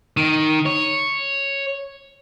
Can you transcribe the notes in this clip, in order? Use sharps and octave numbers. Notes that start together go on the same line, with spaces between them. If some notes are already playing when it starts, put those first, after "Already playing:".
D#3
C#5